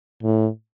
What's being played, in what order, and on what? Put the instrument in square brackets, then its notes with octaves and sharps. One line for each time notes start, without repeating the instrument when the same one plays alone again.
[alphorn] A2